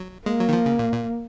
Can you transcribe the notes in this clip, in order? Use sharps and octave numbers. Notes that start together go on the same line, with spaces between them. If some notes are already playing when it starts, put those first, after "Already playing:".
Already playing: F#3
G#3 A#3
F#3
D#3
F3
C#3
A#2
A#2